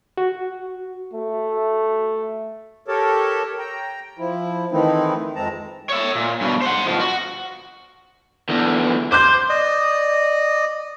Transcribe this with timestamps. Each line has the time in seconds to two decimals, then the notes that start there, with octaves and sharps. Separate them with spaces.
0.17 F#4
1.14 A3
2.88 G4 A4 A#4 C#5 A5
3.59 G5 A#5
4.18 F3 E4
4.72 D#3 E3 A3 C4 D#4 E4
5.36 F2 G#3 C4 A5 A#5
5.89 C#5 E5
6.15 A#2
6.41 G2 B2
6.62 C5 F#5
6.86 B2 F3
7.00 F#4
8.49 E2 D3
9.12 C5 D6 F#6 G6
9.49 D5 D#5 D#6